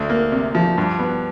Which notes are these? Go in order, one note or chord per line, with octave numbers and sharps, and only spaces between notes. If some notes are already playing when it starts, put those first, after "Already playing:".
Already playing: D2
A#3
C3
F3
G2
B3